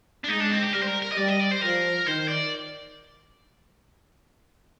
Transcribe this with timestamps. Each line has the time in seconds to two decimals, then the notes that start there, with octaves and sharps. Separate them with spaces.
0.24 D4
0.28 G#3 D#4
0.40 D4
0.51 C4
0.62 G4
0.73 G3 A#4
0.83 C5
0.87 A#4
1.02 A#4
1.12 D#5
1.17 G3 D5
1.28 D#5
1.39 D5
1.51 C5
1.62 F3 A#4
2.06 D#3 C5
2.29 D5